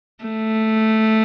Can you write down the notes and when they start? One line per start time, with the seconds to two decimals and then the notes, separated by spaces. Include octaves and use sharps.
0.24 A3